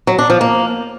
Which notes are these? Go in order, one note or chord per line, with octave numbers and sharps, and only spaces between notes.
F#3
D4
F3
A#3